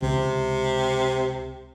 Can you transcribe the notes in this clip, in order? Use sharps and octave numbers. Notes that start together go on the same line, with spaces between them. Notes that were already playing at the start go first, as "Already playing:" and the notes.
C#2 C3